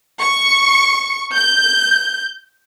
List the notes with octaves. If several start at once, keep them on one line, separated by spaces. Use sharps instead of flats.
C#6
G6